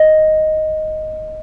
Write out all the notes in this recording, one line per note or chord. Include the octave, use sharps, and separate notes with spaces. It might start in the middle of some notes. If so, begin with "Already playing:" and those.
Already playing: D#5